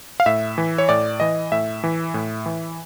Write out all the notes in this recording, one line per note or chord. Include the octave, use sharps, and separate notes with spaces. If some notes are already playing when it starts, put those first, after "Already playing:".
F5
A2 E5
E3
C#5
A2 D5
E3 D#5
A2 E5
E3
A2
E3